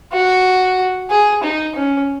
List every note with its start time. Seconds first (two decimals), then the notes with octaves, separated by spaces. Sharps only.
0.13 F#4
1.10 G#4
1.43 D#4
1.75 C#4